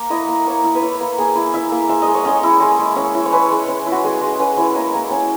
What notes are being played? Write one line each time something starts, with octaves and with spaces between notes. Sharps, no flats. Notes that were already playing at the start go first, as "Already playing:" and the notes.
Already playing: A#3
E4 D#5
A#3
A#3 C#5
E4
B4
E4 C#5
A#3
A#3 G#4
E4
E4 E5
A#3
G#3 E5
D#5
G#3
C#5
C#4 D#5
E4
G#3
G#3
C#4
E4
C#5
G#3 B4
G#3
C#4
E4
F#4
G#3 G#4
G#3
C#4 B4
E4 C#5
A#3 D#5
A#3
C#4